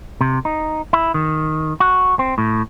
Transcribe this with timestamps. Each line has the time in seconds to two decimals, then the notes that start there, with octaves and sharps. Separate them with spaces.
0.21 C3
0.45 D#4
0.93 E4
1.14 D#3
1.80 F#4
2.19 C4
2.38 A2